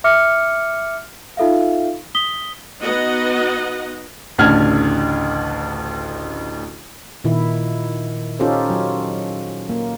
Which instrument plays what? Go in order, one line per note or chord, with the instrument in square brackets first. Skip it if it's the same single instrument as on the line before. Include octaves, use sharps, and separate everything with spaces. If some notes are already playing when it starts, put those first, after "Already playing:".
[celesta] E5 D6 F6 C#7
D#4 F4 A4 E5 F5
D#6 B6 G7
[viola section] B3 D#4 F#4 D#5 F#5
[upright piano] A1 D2 C#3 D4 F6 G#6
[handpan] A#2 D#3 E4
C#4 D#4 F4 G4 A4 C5
F#3
A#3